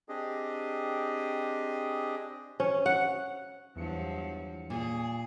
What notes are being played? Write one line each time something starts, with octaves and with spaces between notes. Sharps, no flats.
C4 D4 G4 G#4 D#5
C#4
F#5
E2 G2 F3 F#3 C#7
A#2 G#4